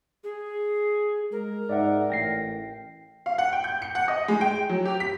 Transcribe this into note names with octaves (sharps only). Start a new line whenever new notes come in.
G#4
G#3 A#4
G#2 D5 E5 F#5
A1 G5 A#6 C7
F5
F#5
G5
G6
C#7
F#5
D#5
G#3
G5
F#3
G4
B6